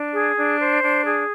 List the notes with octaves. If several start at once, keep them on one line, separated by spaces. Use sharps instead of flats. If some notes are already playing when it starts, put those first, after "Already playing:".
Already playing: D4
G#4
D4
C5
D4
G#4